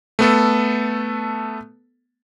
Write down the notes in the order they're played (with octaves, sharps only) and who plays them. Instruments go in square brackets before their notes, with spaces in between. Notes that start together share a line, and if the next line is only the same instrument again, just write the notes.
[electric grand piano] A3 B3 A4